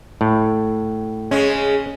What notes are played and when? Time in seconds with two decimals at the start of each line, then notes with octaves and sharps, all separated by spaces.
0.21 A2
1.31 C#3 G#3 C#4